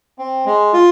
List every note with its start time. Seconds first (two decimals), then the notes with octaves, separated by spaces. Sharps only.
0.18 C4
0.46 G#3
0.73 F4